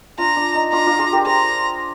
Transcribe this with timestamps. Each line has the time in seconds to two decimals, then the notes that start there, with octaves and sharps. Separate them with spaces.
0.18 D4 F4 A#5
0.36 D4
0.54 D#4
0.72 D4 F4 A#5
0.86 D4 F4
0.99 F4 G#4
1.12 G4 A#4
1.25 G#4 C5 A#5